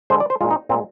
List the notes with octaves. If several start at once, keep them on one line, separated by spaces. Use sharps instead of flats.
D3 G#3 C5
D5
C5
A#2 G#3 F4
D#4
A#2 G#3 C4